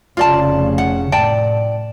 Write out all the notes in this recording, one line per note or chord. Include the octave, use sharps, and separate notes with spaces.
F1 C#3 F4 D5 A5
F#5
A2 D5 G5 A5